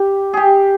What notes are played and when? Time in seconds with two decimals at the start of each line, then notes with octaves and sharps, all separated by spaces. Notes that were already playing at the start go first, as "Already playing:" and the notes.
Already playing: G4
0.33 G4 G#4